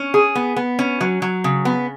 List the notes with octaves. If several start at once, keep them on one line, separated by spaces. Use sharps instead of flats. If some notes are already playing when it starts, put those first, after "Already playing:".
Already playing: C#4
G#4
B3
B3
C#4
F#3
F#3
C#3
B3